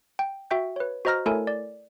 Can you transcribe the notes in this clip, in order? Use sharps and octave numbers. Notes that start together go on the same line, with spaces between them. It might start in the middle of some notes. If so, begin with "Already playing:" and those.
G5
F#4 E5 G5 G6
B4 C#5
F#4 C5 D#5 A#5 F6 A#6
A3 E4 A4 A#4 C#5 G#5
D5